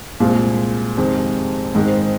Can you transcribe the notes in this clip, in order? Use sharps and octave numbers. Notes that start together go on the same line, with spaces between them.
C2 A#2 G#3 C4 F4
F2 C3 D#3 G#3 C4
G#2 D#3 G#3 C4